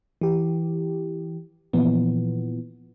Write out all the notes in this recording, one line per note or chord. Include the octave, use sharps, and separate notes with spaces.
E3 G4
A#2 E3 F3 B3